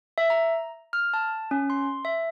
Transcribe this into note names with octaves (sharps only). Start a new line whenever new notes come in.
E5
A#5
F6
A5
C#4
C6
E5